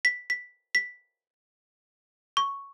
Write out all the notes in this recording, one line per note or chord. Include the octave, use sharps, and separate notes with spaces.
B6
B6
B6
C#6